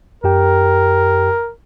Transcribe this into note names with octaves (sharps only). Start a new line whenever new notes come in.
F#2 G4 A#4 G5